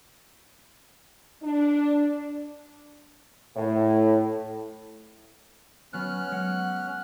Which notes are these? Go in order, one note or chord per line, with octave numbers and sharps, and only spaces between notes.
D4
A2
F#3 B3 C#4 F6 F#6
G#3 F#5